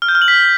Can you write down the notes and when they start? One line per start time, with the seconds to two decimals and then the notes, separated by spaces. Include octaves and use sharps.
0.02 F6
0.08 G6
0.15 F6
0.22 F#7
0.28 B6